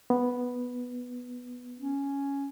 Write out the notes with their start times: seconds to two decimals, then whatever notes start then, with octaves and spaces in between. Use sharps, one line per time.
0.10 B3
1.80 C#4